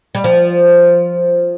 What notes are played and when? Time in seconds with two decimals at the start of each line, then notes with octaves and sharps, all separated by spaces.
0.15 G3
0.24 F3